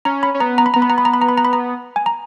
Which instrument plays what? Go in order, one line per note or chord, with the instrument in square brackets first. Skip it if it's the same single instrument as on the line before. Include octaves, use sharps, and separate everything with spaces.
[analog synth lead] C#4 [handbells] A#5
[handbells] B5
[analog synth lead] C#4
[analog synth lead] B3 [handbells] A#5
[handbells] A#5
B5
[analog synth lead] B3 [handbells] A#5
[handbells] B5
A#5
B5
A#5
B5
A#5
B5
A#5
B5
A#5
G#5
A#5